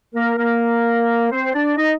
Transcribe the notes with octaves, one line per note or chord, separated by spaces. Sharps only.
A#3 A#4
A#3 A#4
C4 C5
D4 D5
D#4 D#5